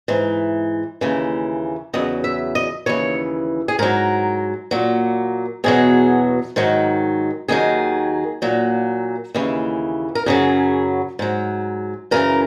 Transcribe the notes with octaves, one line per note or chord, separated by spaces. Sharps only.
G#2 E3
D#2 C#3 E3
E2 C#3 F#3 D#5
E5
D#5
D#2 C#3 E3 C#5
G#4
G#2 F#3 A#4
A#2 F#3
E2 B2 F#3 G#4
G#2 D#3 F#3
D#2 D#3 F#3 G#4
A#2 F#3
D#2 C#3 E3
A#4
F#2 C#3 F#3 G#4
G#2 F#3
F#2 C#3 E3 A#4